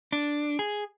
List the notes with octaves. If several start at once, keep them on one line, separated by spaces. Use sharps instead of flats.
D4
G#4